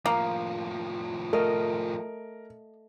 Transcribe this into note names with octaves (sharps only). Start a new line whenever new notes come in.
A2 F3 A#3
A3 A#4 D#5 F5